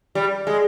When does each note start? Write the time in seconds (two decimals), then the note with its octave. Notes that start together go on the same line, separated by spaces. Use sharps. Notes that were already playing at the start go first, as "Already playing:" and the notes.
0.15 G3
0.47 G#3